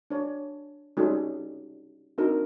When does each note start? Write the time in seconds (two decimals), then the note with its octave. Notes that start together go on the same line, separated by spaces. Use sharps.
0.10 D4 C#5
0.97 G3 C#4 D#4 F#4 A4
2.18 C4 D4 D#4 F#4 A#4